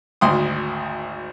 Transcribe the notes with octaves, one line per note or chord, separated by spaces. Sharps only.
G#1 D2 C6 D#6